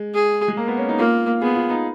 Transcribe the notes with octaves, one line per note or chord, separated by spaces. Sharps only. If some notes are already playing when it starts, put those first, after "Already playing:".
Already playing: G#3
G#4
G#3
A#3
B3
C#4
D#4
A#3 F4
B3 G#4
F4
D#4